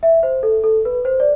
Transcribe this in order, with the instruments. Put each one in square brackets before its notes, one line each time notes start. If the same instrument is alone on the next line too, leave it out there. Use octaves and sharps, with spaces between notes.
[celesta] E5
C5
A4
A4
B4
C5
D5